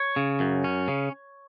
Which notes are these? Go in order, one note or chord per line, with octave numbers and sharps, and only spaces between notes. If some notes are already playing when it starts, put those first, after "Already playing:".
Already playing: C#5
C#3
F#2
C#4
C#3